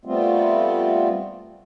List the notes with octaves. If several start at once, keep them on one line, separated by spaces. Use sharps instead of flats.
G3 A3 B3 C4 F4